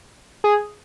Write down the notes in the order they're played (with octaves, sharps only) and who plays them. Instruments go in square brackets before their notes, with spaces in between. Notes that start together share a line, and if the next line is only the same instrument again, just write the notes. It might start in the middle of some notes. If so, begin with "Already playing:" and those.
[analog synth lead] G#4